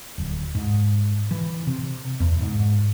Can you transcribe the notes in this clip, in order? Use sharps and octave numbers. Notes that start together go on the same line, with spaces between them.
D1
G#2
E3
C3
E2
G#2